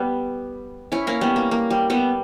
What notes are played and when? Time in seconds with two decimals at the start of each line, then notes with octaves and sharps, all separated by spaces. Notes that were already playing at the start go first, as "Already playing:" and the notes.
Already playing: G3 B3
0.92 C#4 E4
1.07 A#3 C#4
1.21 G3 B3
1.36 A#3
1.51 A#3
1.70 G3
1.90 G3 B3